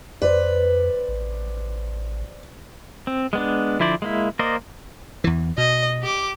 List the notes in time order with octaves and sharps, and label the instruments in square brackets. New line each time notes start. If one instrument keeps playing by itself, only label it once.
[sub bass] F2 [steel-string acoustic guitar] B4 [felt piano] C5 D5
[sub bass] A1
[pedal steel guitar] C4
G#3 B3 D4
D3 F3 E4 C5 D5
G#3 A#3 E4
A#3 A#4 C5 D5 D#5
[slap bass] E2 E3
[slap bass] B2 [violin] D#5
[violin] G4 D6